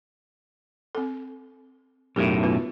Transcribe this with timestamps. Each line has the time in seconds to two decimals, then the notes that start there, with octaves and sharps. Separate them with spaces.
0.95 C4 A4
2.16 B1 F#2 A2 G4 A4 A#4
2.43 B3 F4 B4